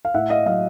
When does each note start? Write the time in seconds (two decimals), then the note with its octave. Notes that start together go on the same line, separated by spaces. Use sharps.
0.05 F5
0.14 A2 E5 F#5
0.30 D#5 F5
0.46 F#3 D#5 F5